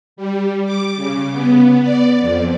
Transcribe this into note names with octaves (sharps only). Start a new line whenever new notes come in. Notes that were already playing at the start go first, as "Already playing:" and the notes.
G3
D6
C#3
B3
D5
F2